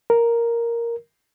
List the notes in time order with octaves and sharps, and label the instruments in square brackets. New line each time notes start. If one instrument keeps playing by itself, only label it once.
[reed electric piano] A#4